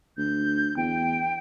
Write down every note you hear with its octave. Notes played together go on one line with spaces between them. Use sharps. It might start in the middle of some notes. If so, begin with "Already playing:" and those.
D2 G6
E2 G5